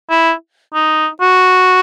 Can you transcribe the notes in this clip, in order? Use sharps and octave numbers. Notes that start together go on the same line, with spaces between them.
E4
D#4
F#4